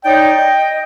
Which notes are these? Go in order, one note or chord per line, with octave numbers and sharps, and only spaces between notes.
D#4 C#5 D5 G5
D#5